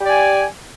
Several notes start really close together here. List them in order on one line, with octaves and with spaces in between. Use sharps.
G4 D5 G#5